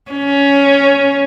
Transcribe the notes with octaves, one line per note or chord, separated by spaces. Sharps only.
C#4